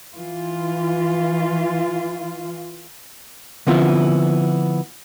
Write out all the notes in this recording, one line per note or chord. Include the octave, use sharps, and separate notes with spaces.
E3 F4
D3 F3 B3 C4 E4 F4